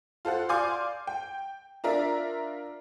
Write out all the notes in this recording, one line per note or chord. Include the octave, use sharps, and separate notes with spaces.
F4 A4 C5 F#5
D5 F5 G#5 C6 D6 G6
G5
D4 F4 A#4 D5 E5